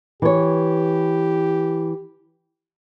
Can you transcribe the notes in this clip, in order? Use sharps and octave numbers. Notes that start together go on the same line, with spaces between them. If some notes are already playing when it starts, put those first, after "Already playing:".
E3 G4 C#5